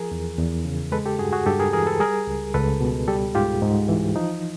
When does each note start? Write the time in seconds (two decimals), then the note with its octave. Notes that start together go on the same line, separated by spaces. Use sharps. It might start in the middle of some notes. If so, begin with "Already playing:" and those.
Already playing: F3 G#4 A#4
0.11 E2
0.38 E2
0.65 C#3
0.92 G#3 A4 B4
1.06 G4 A4
1.19 G2 F#4 G#4
1.33 F#4 G#4
1.46 G2 G4 A4
1.60 G#4 A#4
1.73 E3 G#4 A#4
1.86 A4 B4
2.00 G3 G#4 A#4
2.27 C#2
2.54 C#2 A4 B4
2.81 B2
3.08 G3 G4 A4
3.35 G#2 F4 G4
3.62 G#2
3.89 E3
4.16 F3 D#4